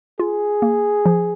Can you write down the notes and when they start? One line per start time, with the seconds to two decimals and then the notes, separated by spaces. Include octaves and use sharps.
0.19 F4 G#4
0.62 A#3
1.06 F3